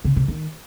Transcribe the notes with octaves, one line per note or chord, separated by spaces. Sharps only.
C#3
C3
D#3